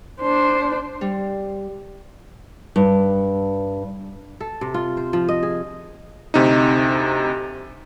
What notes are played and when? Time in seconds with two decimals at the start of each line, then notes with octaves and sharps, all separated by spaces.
0.21 D4 C5
1.01 G3
2.76 G2
4.40 A4
4.61 C3
4.74 F4
4.97 C5
5.13 F3
5.28 D#5
5.43 G#4
6.34 D2 C3 D#4